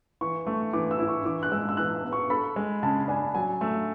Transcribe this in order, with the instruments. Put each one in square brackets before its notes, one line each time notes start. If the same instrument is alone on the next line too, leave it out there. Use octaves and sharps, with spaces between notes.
[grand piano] E3 [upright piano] C#6
[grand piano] A3 [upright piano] C#6
[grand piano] E3 [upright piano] D6
[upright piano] E6
[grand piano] E4
[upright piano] C#6
[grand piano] E3 [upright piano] D6
[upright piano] F#6
[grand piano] G#3 [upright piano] E6
[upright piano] E6
[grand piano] E3 [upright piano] F#6
[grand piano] B3
[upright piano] C#6
[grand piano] A4 [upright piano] B5
[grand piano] G#3
[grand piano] C#3 [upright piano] A5
[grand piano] D4 [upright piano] G#5
[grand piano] F#3 [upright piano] G#5
[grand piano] A3 [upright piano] E6